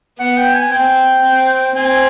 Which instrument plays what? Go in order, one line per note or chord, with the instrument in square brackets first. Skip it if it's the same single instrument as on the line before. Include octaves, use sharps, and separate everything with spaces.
[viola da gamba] B3 [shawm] F#5
[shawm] G5
G#5
[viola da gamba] C4 [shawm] G5
[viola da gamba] C4
[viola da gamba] C4 [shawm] G#5